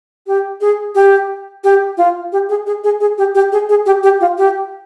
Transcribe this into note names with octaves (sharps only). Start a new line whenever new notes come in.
G4
G#4
G4
G4
F4
G4
G#4
G#4
G#4
G#4
G4
G4
G#4
G#4
G4
G4
F4
G4